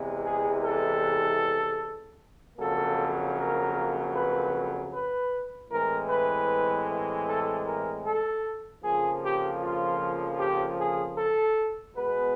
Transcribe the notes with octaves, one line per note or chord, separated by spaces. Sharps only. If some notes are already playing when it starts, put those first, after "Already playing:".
Already playing: E2 C3 E3 G#3
G#4
A4
F2 C#3 F#3 A#3 A4
A#4
B4
B4
A2 E3 G#3 C4 A#4
B4
A4
A#4
A4
F2 C#3 F3 A#3 G#4
G4
F4
G4
G#4
A4
B2 G#3 B3 B4